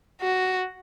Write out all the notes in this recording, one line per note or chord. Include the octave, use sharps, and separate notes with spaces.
F#4